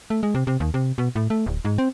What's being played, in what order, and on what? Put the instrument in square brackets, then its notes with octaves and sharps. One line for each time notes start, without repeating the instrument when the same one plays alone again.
[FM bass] A3
G#3
C3
C3
D#2
C3
B2
A2
A3
D1
G#2
C4